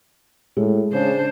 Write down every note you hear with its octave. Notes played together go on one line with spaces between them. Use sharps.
A2 G#3
C#3 D4 C5